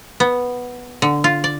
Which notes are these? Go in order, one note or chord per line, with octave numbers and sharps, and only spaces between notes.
B3
D3
F4
D5